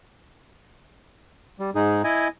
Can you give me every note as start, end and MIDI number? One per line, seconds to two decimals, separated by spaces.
1.60 1.70 55
1.75 2.02 44
1.75 2.02 63
1.75 2.02 68
2.04 2.28 64
2.04 2.28 75
2.04 2.28 80